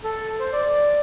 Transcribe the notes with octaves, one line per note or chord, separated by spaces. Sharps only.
A4
C5
D5